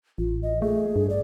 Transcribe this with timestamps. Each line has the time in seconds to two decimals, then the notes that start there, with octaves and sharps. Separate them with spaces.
0.18 A1 F4
0.43 D#5
0.62 A3 G#4
0.96 G2
1.10 D5